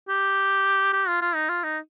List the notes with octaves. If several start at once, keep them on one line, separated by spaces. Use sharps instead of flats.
G4
G4
F4
F4
D#4
F4
D#4